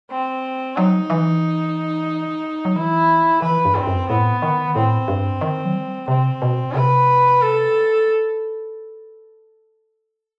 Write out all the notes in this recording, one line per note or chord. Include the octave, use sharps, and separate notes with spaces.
C4
F#3 D#4
E3
F#3
E3 E4
E3 B4
G2
C4
F#2
A2 B3
D#3
A2 C4
G2
D#3
F#3
G3
C3 C4
B2
C3 B4
A4